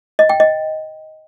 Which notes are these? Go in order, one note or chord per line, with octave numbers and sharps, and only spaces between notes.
D#5
G5
D#5